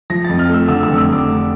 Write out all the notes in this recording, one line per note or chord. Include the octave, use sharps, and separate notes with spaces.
F3 A#6
A6
F2
F6
A3 E6
D3 E6
E6
F1
E6
F1 D6
A3